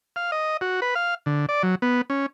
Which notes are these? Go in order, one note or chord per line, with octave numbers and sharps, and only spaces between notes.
F5
D#5
F#4
B4
F5
D3
D5
F#3
B3
C#4